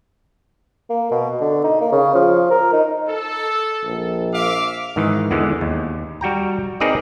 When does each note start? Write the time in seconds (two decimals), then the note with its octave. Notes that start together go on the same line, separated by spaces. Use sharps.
0.90 A#3
1.11 B2
1.41 D3
1.64 D#4
1.81 A#3
1.92 C#3
2.15 F3
2.50 A#4
2.73 D#4
3.09 A4
3.83 A#1
4.34 E5 F5 D6
4.96 G#2 D#3 E3
5.31 E2 D3 E3 G#3
5.61 D#2
6.21 G3 F#4 G5 A#5
6.80 C4 D#4 G#4 A#4 B4 D5